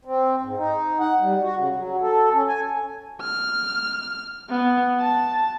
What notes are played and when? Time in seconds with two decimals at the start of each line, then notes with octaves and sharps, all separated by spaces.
0.05 C4
0.41 G#2
0.57 D#4
1.00 F#5
1.20 G3
1.42 F#4
1.56 C#3
1.76 F#3
2.01 A4
2.32 C#4
2.49 G#5
3.22 F6
4.50 B3
5.00 A5